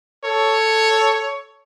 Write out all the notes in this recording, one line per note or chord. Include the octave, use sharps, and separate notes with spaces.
A4 C#5